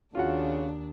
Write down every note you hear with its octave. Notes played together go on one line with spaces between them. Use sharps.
D#2 C#3 D4 F4 F#4 F#5